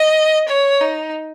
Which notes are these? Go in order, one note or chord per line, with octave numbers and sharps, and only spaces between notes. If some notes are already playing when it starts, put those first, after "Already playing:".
Already playing: D#5
C#5
D#4